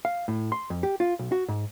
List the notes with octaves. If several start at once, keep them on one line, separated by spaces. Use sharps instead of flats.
F5
A2
C6
F2
G4
F4
B1
F#4
G#2